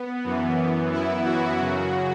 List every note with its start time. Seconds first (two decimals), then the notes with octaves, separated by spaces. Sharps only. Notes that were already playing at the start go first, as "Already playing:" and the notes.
Already playing: B3
0.24 F#2 E3
0.92 E4
1.25 F#4
1.58 F#2 C#3 F#3